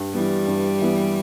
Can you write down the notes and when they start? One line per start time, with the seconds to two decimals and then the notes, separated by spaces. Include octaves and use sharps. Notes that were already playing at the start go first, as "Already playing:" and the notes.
Already playing: G2
0.14 E3 G3 B3
0.47 G2
0.81 E3 B3